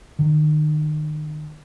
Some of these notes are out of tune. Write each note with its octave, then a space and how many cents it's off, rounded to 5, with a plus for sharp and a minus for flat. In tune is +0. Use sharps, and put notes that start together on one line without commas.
D#3 -35